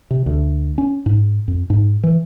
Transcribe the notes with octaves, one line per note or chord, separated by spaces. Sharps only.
C3
D2
C#4
G#2
F2
G#2
E3